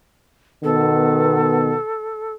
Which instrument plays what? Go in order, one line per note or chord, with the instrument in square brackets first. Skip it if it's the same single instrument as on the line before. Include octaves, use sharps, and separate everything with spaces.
[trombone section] B2 D#3 B3 [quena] A4